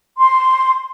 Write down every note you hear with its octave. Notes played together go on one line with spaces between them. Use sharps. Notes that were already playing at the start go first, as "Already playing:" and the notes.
C6